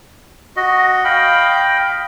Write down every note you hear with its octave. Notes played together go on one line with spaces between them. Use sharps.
F#4 D#5
D#5 F5 G5 B5